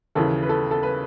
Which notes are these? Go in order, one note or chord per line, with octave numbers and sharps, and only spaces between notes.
D#2 C#3 E3 A4
B4
A4
A4
B4